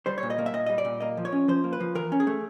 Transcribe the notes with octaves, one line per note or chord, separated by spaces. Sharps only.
G3 C5
C#5
A#2
D#5
A#3
E5
A#2 D#5
G3 D#5
D5
A#2
A#3 D#5
F3
C#5
C#4
F3 C5
A#3
B4
F3
E3 A#4
C#4
G#4
A3